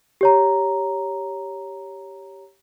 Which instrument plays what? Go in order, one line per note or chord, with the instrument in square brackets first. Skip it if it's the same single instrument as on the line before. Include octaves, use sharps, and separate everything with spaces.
[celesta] G4 C#5 A#5